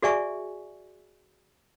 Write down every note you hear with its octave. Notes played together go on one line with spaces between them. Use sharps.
F#4 G#4 D5 E5 G#5 C#6